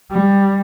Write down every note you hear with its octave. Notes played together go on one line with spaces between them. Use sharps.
G3